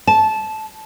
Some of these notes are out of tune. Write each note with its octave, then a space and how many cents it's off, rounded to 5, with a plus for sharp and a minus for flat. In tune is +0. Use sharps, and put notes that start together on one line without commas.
A5 -15